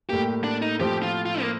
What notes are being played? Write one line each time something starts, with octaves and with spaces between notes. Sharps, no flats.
A2 G3 A#3 G4
D4
D#4
A2 F3 C4 G4
F4
F4
A#3